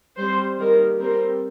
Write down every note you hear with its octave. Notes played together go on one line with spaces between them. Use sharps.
G3 C4 C5
D#3 G3 A#3 A#4
G3 C4 A#4